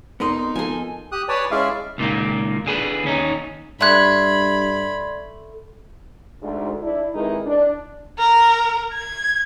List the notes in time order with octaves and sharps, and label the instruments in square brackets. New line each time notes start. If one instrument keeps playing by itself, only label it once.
[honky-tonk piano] F1 C6 [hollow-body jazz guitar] B3 A#4 D#5 [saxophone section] D#4
[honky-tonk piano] F3 A4 [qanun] G#5 C6
[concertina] G4 D#6 F#6
B4 C#5 D5 G#5 A5
G#3 C#4 E4 D5 E5 F5
[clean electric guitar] C#2 A#2 D#3 A#3
D3 G#4 B4
D#2 C#4 D#4
[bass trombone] G2 [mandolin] A3 F#6 [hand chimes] D5 C6 G#6 [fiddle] B5
[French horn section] D2 G#2
D4 E4
C3 D#3 E3 G#3 D#4 E4
D4
[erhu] A#4
G#6